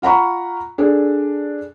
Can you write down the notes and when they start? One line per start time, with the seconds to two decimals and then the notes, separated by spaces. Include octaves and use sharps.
0.02 F4 F#5 A#5 B5 C#6
0.78 D4 G#4 A4